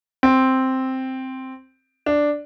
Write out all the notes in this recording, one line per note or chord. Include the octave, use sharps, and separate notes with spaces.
C4
D4